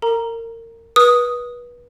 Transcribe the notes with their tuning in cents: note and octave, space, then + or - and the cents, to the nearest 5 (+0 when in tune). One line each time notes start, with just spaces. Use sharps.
A#4 -30 A#5 +5
B4 -30 D#6 +0